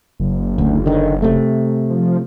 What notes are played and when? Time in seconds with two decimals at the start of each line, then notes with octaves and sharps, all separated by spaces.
0.20 F#1
0.58 D2
0.86 D3 D#3
1.22 C3 A3
1.90 F3